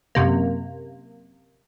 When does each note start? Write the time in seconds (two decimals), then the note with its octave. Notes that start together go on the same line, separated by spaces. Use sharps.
0.15 F#2 C3 A#3